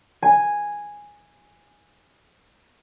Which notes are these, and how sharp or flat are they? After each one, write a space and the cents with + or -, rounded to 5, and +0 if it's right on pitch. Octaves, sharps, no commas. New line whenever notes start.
G#5 -5